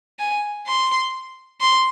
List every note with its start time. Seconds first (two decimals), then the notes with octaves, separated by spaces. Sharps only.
0.19 G#5
0.66 C6
1.61 C6